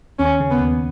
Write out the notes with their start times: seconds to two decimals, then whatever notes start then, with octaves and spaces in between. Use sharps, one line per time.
0.19 D#2 C#4
0.40 C#3
0.51 B3
0.60 D#2